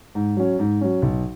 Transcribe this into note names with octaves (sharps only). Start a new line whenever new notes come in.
G#2
F#3 C#4
G#2
F#3 C#4
B1